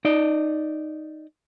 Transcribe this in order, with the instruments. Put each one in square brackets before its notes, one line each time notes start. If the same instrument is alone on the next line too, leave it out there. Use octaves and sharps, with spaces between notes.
[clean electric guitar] D#4 D5 D#5